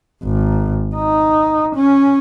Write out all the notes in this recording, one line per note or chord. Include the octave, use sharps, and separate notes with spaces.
G#1
D#4
C#4